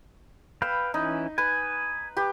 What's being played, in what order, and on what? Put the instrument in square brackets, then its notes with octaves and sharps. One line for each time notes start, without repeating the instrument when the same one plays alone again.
[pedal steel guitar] B4 F5 G5 [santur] B5 E6
[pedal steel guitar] E3 C#4 E4 [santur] D#4
[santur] B4 [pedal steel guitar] G#5
[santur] G4 B4